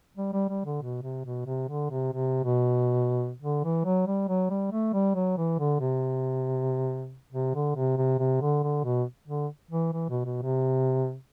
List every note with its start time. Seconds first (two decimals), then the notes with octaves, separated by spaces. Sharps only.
0.17 G3
0.33 G3
0.49 G3
0.65 D3
0.82 B2
1.03 C3
1.25 B2
1.46 C3
1.69 D3
1.90 C3
2.12 C3
2.44 B2
3.42 D3
3.64 E3
3.85 F#3
4.07 G3
4.29 F#3
4.50 G3
4.72 A3
4.93 G3
5.15 F#3
5.37 E3
5.59 D3
5.80 C3
7.32 C3
7.55 D3
7.76 C3
7.97 C3
8.19 C3
8.42 D3
8.63 D3
8.84 B2
9.28 D3
9.71 E3
9.93 E3
10.10 B2
10.25 B2
10.42 C3